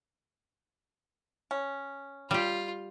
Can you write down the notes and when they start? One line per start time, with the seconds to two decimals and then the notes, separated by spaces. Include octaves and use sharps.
1.51 C#4
2.31 G3 F4 G4